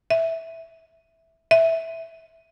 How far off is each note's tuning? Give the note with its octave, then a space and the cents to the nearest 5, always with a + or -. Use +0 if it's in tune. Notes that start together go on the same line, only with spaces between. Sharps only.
E5 -5
E5 -5